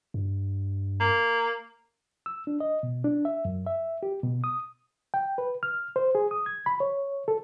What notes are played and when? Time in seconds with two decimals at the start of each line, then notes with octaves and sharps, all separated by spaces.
0.14 G2
1.00 A#3
2.26 E6
2.47 D4
2.60 D#5
2.83 B2
3.04 D4
3.25 E5
3.45 F#2
3.67 E5
4.03 G4
4.24 B2
4.44 D#6
5.14 G5
5.38 B4
5.63 F6
5.96 C5
6.15 G#4
6.31 D#6
6.46 G#6
6.66 B5
6.80 C#5
7.28 A4